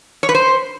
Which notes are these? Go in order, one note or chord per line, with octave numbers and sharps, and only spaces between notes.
C#5
B4
C5